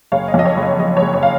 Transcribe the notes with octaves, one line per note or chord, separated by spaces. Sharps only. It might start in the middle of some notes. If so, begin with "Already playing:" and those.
F#1 C#5 F5
D#5
F2
D#5
C#5
F#1
D#5
F#1 D#5
C#5
F#1
C#5
F5